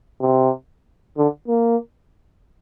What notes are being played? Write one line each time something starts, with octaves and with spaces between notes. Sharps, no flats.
C3
D3
A#3